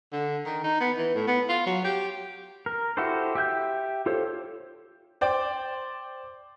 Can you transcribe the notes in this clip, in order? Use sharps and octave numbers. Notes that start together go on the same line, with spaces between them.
D3
D#3
D#4
B3
E3
A2
B3
F4
F#3
G4
A#4
E4 F#4 G4 A4 C5
G4 E5 G5 G6
F4 G4 A4 C5 C#5
C5 D5 G5